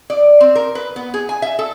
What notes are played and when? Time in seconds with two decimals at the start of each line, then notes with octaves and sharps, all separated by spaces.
0.10 D5
0.40 C4
0.55 A#4
0.75 B4
0.96 B3
1.14 G#4
1.29 G#5
1.42 E5
1.59 A4